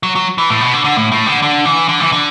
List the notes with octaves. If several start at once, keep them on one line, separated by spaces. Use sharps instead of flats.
F#3
F#3
E3
A2
B2
D3
D3
A2
A2
D3
D3
E3
D3
E3
D3